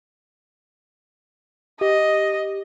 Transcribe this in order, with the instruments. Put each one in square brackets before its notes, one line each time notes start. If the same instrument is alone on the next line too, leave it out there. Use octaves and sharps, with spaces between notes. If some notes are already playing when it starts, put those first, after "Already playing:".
[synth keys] G4 [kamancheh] D#5